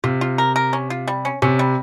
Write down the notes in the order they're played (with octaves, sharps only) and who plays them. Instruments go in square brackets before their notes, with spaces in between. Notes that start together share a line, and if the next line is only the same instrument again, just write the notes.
[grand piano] C3 [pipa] F4
[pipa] F4
A#4
A#4
C#4
F4
G3
C#4
[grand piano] C3 [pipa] C#4
[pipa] G3